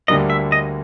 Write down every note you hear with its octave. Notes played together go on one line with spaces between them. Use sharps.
D2 D3 G3 A#3 D#5
E5
D#5